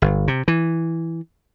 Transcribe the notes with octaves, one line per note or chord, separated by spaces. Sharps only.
G1
C3
E3